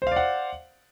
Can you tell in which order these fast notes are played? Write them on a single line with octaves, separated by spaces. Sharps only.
C5 F5 D5 F#5